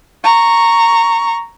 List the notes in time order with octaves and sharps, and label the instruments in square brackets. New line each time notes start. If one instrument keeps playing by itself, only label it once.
[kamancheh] A#5 C#6